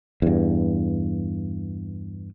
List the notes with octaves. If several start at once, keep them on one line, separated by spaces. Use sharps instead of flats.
E2 G2